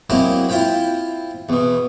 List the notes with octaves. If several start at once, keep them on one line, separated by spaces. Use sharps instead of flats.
F#3 G#3 A#3 C4 E4
E4 F4 C5 G5 B5
E2 B2